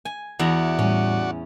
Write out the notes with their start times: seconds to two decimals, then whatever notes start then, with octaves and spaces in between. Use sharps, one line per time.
0.05 G#5
0.39 E2 E4 F#4 D5 F#5 A#5
0.79 A2 G3 C#4